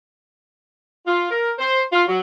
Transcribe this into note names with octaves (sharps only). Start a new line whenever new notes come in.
F4
A#4
C5
F4
F#3